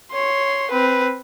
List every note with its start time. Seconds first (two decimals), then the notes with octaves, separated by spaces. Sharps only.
0.11 C#5 C6
0.70 C4 B4